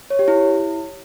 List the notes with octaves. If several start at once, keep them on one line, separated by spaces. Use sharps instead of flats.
C#5
G4
E4